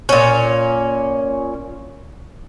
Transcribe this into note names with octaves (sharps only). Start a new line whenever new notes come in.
A#2 C#4